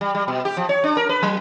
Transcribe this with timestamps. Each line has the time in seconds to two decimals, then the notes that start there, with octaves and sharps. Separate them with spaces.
0.01 G3
0.15 G3
0.28 B2
0.45 G4
0.57 F3
0.69 C#5
0.84 D4
0.97 A#4
1.09 B4
1.23 F#3